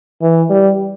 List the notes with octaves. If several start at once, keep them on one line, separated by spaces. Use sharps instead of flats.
E3
G3